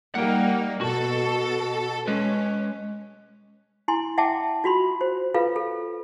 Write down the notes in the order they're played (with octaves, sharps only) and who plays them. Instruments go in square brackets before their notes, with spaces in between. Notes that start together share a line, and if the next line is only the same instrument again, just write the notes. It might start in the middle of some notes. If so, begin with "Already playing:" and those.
[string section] G3 A#3 D#4 [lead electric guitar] F#5 G5
[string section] B2 A4 [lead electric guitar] F#4
[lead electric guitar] G#3 B4 [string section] C#4
[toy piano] E4 G#5 C6
E5 F#5 G5 A5 D6
F4 F#4 B5 C6
C5
F4 A4 B4 F5
A4